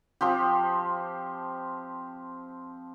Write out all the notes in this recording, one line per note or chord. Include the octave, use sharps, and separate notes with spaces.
F3 C4 G4